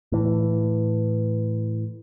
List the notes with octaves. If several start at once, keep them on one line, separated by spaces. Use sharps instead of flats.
A2 E3